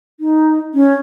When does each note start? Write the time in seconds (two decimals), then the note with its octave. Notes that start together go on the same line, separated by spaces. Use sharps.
0.20 D#4
0.74 C#4